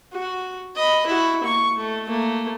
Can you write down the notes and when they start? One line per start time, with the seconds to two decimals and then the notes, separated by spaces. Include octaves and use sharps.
0.13 F#4
0.76 D#5 B5
1.07 E4 F#4
1.44 A#3 C#6
1.76 A3
2.08 A3 A#3